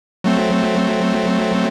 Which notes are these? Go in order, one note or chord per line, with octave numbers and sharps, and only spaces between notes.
F#3 A3 C4